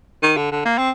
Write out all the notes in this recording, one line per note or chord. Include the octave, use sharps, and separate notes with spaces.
D#3
D3
D3
A#3
C4